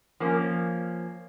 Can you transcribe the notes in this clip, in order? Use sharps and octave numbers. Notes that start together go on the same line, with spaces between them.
F3 A#3 C#4